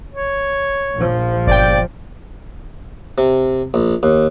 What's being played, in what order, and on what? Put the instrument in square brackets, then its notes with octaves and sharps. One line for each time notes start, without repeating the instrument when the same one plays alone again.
[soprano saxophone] C#5
[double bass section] A#1 F3
[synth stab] G1 G5 [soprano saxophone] D5
[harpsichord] C3
A#1
D#2